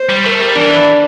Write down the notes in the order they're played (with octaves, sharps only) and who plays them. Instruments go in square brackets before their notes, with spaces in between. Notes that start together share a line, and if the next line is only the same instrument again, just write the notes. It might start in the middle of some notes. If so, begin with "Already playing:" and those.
Already playing: [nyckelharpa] C5
[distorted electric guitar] G3
[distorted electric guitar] A3 [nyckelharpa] A#4
[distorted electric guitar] G3
[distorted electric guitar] E3 [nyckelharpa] D4